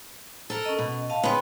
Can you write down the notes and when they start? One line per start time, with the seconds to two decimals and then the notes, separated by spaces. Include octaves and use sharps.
0.50 A4 A#4
0.65 C#4 D#5
0.78 B2
1.10 D#5 F5 A5
1.23 C#3 B3 B4 G5 C6